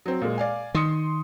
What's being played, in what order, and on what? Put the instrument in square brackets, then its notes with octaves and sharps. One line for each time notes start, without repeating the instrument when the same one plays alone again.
[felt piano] F#3 C4
A#2 G#3
D5 F5 G#5
[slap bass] D#3 [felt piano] C6 D#6 C#7